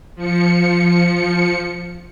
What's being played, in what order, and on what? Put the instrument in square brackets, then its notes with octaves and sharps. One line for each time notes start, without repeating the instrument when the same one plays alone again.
[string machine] F3 C#7